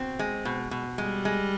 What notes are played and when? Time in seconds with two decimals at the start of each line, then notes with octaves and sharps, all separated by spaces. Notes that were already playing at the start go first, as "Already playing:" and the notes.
Already playing: B2 C4
0.19 G#3
0.45 B2
0.71 B2
0.98 G3 G#3
1.25 G#3